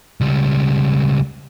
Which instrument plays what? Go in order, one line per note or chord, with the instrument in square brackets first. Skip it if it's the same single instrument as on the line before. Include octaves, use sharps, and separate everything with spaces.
[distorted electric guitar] C#2 G3